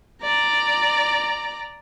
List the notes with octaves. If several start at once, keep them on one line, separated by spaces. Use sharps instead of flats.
D5 A#5